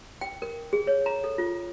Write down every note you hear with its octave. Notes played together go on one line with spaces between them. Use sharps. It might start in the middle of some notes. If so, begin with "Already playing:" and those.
G5
A#4
G#4
C#5
A#5
A4
F4